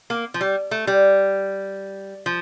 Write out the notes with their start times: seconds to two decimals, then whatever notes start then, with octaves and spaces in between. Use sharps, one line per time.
0.10 A#3
0.34 F3
0.41 G3
0.71 A3
0.87 G3
2.26 F3